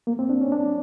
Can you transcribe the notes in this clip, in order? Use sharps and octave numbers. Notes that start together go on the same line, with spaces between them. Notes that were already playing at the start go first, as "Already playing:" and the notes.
A#3
C4
D4
C#4
D4